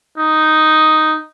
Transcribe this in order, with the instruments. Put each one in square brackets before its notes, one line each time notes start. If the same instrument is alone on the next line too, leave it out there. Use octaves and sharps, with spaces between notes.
[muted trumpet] D#4